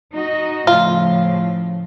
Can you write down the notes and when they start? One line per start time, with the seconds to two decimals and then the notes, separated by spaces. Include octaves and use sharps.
0.12 D#4 F#4 D#5
0.67 A2 C#3 F3 F4